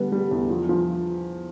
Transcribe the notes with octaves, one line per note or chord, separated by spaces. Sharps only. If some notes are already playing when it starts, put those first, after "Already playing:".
Already playing: D3 G3 B3
G3
E2
F3
F3